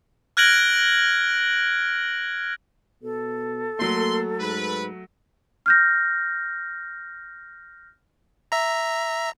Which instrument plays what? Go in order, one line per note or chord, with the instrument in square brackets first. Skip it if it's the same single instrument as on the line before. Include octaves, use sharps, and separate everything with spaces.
[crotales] F6 F#6 G#6 A#6 D7 F#7
[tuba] B2 [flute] A4
[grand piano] F#3 A3 [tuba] A#3 [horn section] C6
[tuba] G#2 [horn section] B4
[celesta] F6 G6 A#6
[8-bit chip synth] E5 A#5